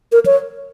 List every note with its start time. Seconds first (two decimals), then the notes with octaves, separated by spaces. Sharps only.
0.12 A#4
0.26 C#5